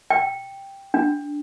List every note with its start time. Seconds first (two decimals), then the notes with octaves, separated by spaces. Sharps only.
0.10 G5
0.94 D4